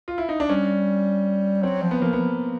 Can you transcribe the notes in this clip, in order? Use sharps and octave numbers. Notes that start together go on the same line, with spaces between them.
F4
E4
D#4
D4
G3 C#4
F#3 C4
F3
B3
F3 A#3
B3
F3